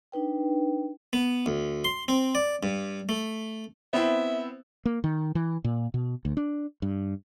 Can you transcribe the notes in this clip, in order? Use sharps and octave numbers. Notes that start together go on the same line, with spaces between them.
D4 D#4 B4 G5
B3
D2
C6
C4
D5
G2
A3
B3 C4 E4 E5
A#3
D#3
E3
A#2
B2
D2
D4
G2